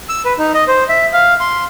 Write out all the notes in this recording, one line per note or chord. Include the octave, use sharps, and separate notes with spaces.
E6
B4
D#4
D#5
C5
E5
F5
C6